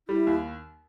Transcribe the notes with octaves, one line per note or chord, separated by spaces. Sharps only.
G3 E4
D#2